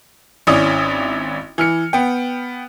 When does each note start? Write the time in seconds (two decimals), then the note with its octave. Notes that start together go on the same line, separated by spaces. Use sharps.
0.47 G#1 C#4 E4 D5 D#6
1.58 E3 F6 C#7
1.93 B3 G5